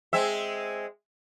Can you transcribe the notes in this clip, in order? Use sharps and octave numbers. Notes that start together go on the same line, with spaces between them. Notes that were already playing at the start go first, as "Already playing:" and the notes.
G#3 C4 E5